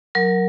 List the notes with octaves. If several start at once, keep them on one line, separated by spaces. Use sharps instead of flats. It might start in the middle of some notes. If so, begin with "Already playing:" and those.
F#3 A#4